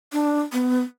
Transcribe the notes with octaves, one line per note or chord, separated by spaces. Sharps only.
D4
B3